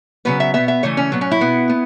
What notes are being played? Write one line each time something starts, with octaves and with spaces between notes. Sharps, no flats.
C#3 F#3 B3 B4
E5
B2 B3 E5
E5
C#3 E3 A3 C#5
C#4
A2 F#3 B3
C#4
E4
B2 B3
B3